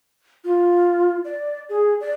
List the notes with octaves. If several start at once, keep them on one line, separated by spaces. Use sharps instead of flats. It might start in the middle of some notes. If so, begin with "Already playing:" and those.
F4
D5
G#4
D5